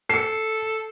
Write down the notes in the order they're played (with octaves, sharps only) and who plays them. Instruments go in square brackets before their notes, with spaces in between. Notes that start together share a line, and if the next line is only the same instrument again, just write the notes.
[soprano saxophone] A4 [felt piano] C7 C#7